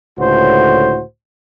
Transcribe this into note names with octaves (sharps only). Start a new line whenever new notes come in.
C#2 A2 D3 F#4 C5